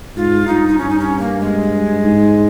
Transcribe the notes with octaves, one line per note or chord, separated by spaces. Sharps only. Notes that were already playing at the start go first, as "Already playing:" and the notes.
G#2 F4
G2 D#4
D#4
G2 C#4
D#4
C#4
A#3
G#3
G#2